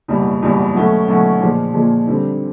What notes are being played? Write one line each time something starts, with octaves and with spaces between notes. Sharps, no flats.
F#1 E2 B2 G3
F#1 E2 B2 G3
B2 F#3 A3 C#4 F#4
B2 F#3 A3 C#4 F#4
A#2 F3 G#3
A#2 F3 G#3
D3 G3 C4